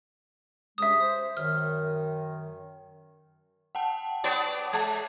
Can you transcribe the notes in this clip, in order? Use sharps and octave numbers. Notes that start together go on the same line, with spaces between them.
G2 C#3 G#3 E5 D#6
C5
F#2 D#3 F6
F#5 G5 A5
B3 C#5 D5
G#3 G#6